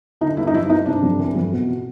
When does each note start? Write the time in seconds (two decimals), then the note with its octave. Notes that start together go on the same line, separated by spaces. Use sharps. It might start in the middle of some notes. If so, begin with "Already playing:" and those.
0.21 D3 D#4
0.37 G2 E4
0.47 D#4
0.54 F3 E4
0.70 G2 D#4
0.86 C3 D4
1.02 F2
1.19 E3
1.35 F2
1.52 B2